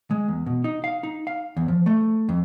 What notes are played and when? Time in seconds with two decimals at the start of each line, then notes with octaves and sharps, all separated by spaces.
0.11 G#3
0.28 E2
0.46 B2
0.64 D#4
0.84 F5
1.03 D#4
1.27 F5
1.57 E2
1.68 F3
1.86 A3
2.29 F2